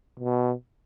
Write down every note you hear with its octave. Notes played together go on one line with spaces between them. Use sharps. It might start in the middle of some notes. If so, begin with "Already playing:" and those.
B2